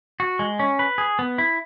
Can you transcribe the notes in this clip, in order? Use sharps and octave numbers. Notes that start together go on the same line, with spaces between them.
F#4
G#3
C#4
B4
G#4
B3
E4